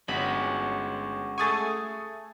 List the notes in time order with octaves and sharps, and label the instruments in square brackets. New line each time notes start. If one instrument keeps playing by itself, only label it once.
[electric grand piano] G1 [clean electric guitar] G#3 C#4 F#4 [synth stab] B5
[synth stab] A3 G#4 G#5 [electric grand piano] C#6 D#6 A6